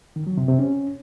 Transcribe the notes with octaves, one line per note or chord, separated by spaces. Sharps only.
D#3
F#3
C3
C3
C#4